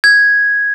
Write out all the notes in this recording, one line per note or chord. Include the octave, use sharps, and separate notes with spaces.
G#6